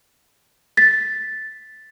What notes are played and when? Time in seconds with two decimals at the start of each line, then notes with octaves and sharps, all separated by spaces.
0.77 A6 B6